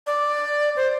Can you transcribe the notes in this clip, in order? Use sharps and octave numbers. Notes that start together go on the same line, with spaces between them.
D5
C5